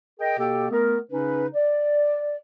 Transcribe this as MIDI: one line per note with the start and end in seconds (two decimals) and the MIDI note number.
0.19 0.36 68
0.19 0.36 70
0.19 0.36 75
0.19 0.36 79
0.38 0.67 47
0.38 0.67 58
0.38 0.67 67
0.38 0.67 69
0.38 0.67 79
0.71 0.97 57
0.71 0.97 59
0.71 0.97 70
1.10 1.46 49
1.10 1.46 61
1.10 1.46 63
1.10 1.46 71
1.54 2.36 74